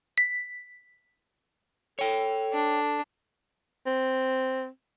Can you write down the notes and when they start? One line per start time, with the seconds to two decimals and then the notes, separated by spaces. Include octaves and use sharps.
0.18 B6
1.99 A4 C#5 G5
2.53 D4
3.86 C4